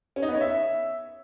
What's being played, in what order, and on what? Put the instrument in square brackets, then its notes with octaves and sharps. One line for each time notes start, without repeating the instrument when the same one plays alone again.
[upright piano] C#4
D#4
B3
C#5
E5